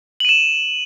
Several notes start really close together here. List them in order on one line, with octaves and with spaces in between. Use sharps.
F#7 D#7 E7